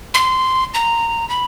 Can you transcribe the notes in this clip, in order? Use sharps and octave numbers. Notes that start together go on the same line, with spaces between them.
C6
A#5
B5